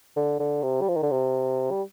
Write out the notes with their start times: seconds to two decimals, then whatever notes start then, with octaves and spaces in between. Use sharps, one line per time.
0.17 D3
0.39 D3
0.63 C3
0.81 G3
0.88 F3
0.96 D#3
1.03 D3
1.11 C3
1.71 G3